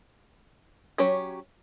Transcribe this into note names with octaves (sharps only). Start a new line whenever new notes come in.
F#3 C#4 G4 C#5